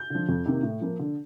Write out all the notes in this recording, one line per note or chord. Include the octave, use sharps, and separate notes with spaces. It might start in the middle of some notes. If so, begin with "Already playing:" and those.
Already playing: G6
D3 F3
F2
C3 D#3 A#3
A2
F3 A#3
D3